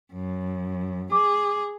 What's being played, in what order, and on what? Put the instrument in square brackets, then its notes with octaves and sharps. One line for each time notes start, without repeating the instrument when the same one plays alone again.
[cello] F#2
[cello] G#4 [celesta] D6